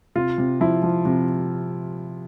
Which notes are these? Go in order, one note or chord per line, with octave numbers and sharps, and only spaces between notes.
C3 F4
C3
F3 E4
F3
C3